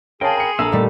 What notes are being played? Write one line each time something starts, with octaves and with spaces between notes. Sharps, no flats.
G#4 A#4 C#5 F5 G5 A5 B5 C6
A#5 C#7
A#1 A4 A#4 E5
A#2 G3 A3 D#4